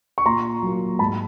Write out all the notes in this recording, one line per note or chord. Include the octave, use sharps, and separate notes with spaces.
C#6
A#2 A#5 C6
F#3 A#3
G#2 A5 B5